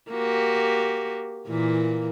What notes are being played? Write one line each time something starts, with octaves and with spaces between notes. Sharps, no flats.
A#3 F#4 G4
A#2 E3 A#3